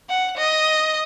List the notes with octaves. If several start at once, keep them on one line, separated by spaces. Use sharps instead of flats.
F#5
D#5